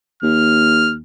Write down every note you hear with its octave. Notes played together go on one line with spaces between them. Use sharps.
D#2 F6